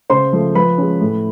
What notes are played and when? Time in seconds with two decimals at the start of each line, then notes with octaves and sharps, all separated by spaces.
0.10 C#3 C5 C6
0.33 F3 A3
0.55 F3 B4 B5
0.78 G#3 C#4
1.01 A2